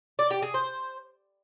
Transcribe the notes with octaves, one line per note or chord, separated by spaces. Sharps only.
D5
G4
G#4
C5